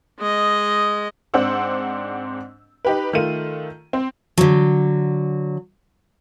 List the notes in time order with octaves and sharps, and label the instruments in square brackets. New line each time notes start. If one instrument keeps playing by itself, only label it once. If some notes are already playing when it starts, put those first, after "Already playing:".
[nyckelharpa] G#3 D#5
[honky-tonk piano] G#2 C4 D4 C5 F#5 E6
D#4 G4 B4
D#3 A3 F4 D#7
C4
[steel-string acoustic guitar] D3 F#3